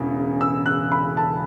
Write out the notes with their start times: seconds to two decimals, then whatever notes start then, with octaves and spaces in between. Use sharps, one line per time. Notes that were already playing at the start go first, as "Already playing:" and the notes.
Already playing: E1 E2 C#3
0.41 E6
0.66 F#6
0.92 B5
1.17 A5